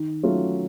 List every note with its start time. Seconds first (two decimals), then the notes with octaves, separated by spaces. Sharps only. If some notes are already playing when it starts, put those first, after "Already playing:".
Already playing: D#3
0.23 F#3 A3 C#4 F4